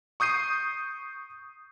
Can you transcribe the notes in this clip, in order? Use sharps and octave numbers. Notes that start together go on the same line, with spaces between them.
C#6 D#6 G6 C7 D#7